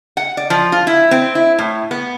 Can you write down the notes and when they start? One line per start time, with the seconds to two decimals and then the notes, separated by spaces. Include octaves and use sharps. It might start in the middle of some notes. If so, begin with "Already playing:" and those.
0.17 F#5
0.37 D5
0.50 F3
0.72 F4
0.87 E4
1.11 C4
1.35 E4
1.59 A2
1.91 B3